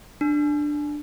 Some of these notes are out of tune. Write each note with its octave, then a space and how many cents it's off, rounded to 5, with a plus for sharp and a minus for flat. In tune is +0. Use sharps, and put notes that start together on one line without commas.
D4 +10